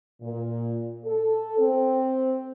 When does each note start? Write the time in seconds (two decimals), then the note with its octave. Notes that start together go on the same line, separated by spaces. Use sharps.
0.21 A#2
1.05 A4
1.58 C4